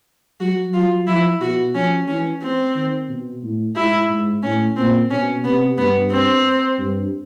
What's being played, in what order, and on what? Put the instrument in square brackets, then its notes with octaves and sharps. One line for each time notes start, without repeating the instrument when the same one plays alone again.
[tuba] F#3 [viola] F#4
[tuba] F#3 [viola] F4
[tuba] F3 [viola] E4
[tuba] B2 [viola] F#4
[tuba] F3 [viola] C#4
[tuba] E3 [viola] C#4
[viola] C4
[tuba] D#3
B2
A2
[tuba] G#2 [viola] E4
[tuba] G#2
[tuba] A2 [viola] C#4
[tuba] A#2 [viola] C4
[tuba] B2 [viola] C#4
[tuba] C3 [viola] B3
[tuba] G2 [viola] B3
[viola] C4
[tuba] G2